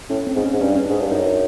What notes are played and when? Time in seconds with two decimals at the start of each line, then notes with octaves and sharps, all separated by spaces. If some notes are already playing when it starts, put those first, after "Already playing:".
0.10 A2 C#4
0.27 C4
0.36 G#2
0.44 C#4
0.53 G#2
0.61 G2 C#4
0.68 D4
0.76 C#4
0.86 G#2 D4
1.01 G2
1.12 F#2 D#4